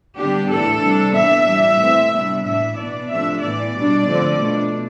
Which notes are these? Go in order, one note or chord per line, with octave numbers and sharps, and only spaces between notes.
D3 G3 B3 D4 G4
A2 E3 A3 D4 A4
C3 G3 D4
E3 B3 D4 E5
E3 G3 D4
E3 A3 C4
C3 G3 B3 D4
A2 E3 B3 D4 E5
B2 B3 D4 D5
C3 F3 A3 D4 E5
A2 E3 B3 D5
B2 G3 D4
D3 F3 A3 C4
B2 A3 D4